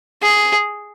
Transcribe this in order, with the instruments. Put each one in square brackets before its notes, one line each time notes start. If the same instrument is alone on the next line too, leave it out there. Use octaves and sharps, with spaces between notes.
[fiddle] G#4